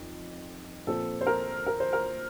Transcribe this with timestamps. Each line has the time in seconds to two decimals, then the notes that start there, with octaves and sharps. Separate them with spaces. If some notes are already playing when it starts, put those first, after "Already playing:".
Already playing: F2 D#3
0.87 A#2 F3 C4 A4
1.21 C5
1.27 A#4
1.67 A#4
1.80 C5
1.93 A#4